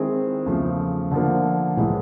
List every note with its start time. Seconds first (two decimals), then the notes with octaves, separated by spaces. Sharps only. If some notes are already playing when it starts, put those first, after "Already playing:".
Already playing: D#3 G#3 C4 E4 G#4
0.46 E2 C#3 F3 A3
1.11 D3 F3 A#3
1.77 A2 E3 G#3